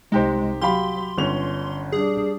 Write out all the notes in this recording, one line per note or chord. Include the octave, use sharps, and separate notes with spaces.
C2 G#3 D#4 G4 C5
F#3 G4 F5 B5 C6
G1 D3 C#4 F7
G3 D4 G#4